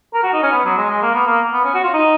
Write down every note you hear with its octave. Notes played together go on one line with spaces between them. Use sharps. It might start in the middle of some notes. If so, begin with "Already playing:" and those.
A#4
F#4
D#4
C#4
B3
F#3
G#3
G#3
A#3
B3
A#3
B3
C#4
F#4
F4
D#4